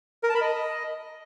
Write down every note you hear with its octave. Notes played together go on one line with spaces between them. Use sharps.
A#4
A5
B5
D#5